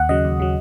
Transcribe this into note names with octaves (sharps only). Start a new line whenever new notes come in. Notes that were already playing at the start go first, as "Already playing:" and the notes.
Already playing: D#2 F#5
C#3 F#3 D#5
D#2
C#3 F#3